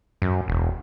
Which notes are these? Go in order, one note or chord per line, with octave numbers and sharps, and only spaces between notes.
F#2
E1